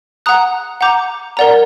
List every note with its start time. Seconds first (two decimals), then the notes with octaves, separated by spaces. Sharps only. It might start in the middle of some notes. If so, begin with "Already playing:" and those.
0.26 F#5 A#5 D#6 F#6
0.81 F#5 A#5 D6 G6
1.37 A#4 D5 F#5 A#5